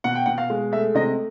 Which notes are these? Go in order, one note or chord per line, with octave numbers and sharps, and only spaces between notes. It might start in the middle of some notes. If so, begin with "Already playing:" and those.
B2 F#5
G5
B2 F#5
F5
G#3
A3 E5
C3 D#5